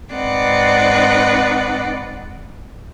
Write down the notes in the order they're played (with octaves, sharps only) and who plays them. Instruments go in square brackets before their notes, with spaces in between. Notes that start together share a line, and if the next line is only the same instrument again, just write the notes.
[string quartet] G#2 C4 D#4 B4 D5 F#5